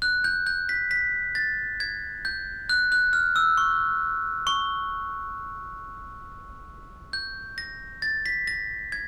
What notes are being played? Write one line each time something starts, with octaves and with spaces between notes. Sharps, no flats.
F#6
G6
G6
B6
B6
A6
G#6
G6
F#6
F#6
F6
E6
C#6
C#6
G6
A#6
A6
B6
A#6
G#6